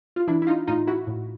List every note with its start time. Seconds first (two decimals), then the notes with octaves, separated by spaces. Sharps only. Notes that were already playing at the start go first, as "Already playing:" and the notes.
0.16 F4
0.27 E3 D4 E4
0.42 E4
0.47 D#4 F4
0.67 A2 D#4 F4
0.87 E4 F#4
1.07 A2